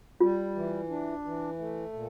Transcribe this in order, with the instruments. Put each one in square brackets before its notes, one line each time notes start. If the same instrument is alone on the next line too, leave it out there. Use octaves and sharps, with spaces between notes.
[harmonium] G3 [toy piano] F4
[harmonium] E3
D4
E3
A3
A#2